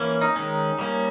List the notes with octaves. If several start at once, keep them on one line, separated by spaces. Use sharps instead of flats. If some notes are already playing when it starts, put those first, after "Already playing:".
Already playing: E3 A#3 C#4
D#4
D#3 G#3 C#4
G3 A#3 C#4